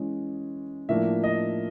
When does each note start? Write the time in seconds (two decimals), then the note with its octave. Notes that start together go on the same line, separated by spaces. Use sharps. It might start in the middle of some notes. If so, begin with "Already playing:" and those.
Already playing: E3 G#3 C#4
0.89 A2 F3 A#3 D4 E5
1.23 D#5